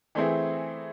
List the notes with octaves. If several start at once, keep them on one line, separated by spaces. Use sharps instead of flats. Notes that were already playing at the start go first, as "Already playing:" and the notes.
E3 A3 C4 E4 G#4